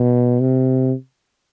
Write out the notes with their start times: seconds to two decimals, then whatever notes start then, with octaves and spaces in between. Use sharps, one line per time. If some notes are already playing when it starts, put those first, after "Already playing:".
Already playing: B2
0.40 C3